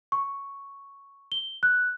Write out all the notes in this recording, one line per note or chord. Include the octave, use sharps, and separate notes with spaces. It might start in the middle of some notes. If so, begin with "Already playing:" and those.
C#6
G7
F#6